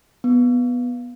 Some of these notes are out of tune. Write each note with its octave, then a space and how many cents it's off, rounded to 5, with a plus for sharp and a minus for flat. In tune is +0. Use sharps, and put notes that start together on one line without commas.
B3 -5